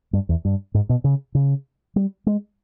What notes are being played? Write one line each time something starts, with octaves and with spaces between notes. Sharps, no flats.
G2
E2
G2
G#2
B2
C#3
C#3
G3
G#3